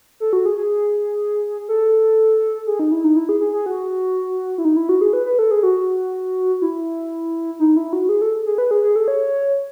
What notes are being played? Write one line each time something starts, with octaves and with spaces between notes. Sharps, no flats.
A4
F#4
G#4
G#4
A4
G#4
D#4
E4
D#4
E4
G#4
G#4
G#4
F#4
E4
D#4
E4
F#4
G#4
B4
B4
A4
G#4
F#4
E4
D#4
E4
F#4
G#4
A4
G#4
B4
G#4
G#4
A4
C#5